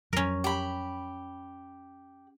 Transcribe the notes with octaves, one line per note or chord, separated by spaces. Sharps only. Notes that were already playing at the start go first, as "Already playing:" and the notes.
F2 F#3 C#4 A#4
G4 B5